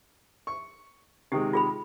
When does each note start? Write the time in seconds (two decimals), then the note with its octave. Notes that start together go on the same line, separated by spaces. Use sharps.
0.47 C#6
1.32 C3 D#3 G#3 G4
1.53 F4 G#4 B5